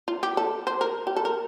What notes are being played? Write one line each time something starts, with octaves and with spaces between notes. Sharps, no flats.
F4
G4
A4
C5
A#4
G4
A4
A#4